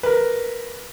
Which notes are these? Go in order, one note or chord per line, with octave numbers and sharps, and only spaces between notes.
A#4 B4